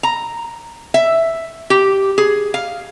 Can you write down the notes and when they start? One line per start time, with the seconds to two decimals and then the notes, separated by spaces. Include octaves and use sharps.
0.03 A#5
0.94 E5
1.70 G4
2.18 G#4
2.54 F5